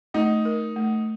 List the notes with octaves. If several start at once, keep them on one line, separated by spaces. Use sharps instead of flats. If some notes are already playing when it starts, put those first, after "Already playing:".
A3 D#4
A#4
A3